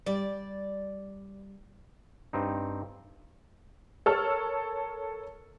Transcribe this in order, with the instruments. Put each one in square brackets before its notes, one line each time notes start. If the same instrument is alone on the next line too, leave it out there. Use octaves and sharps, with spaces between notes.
[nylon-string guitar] G3 [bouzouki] D5
[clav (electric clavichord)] G2 C4 D#4
[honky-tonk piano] A4 A#4 C#5 A5 E6 F6